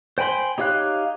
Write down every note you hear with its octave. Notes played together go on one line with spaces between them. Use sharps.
C5 G5 G#5 B5 C6
D#4 G4 C#5 F5 F#6